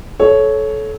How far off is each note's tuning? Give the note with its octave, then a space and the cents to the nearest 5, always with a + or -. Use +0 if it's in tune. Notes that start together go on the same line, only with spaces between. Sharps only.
A4 -25 C#5 +0